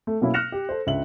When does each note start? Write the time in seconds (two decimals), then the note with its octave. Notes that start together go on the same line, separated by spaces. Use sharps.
0.07 A3
0.21 B2 F#3 A#3 C#4 E4
0.34 F6 F#6 A#6 C#7 E7 F7
0.52 G4
0.69 A4 C5
0.87 C#2 D4 E5 F#7